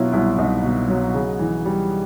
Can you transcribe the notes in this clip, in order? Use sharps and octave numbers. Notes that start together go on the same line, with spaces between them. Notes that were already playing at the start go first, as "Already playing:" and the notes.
Already playing: B2 F#3 E4 F4
C2 E4
C2 D#4
B2
F#3
C#3
E3
G3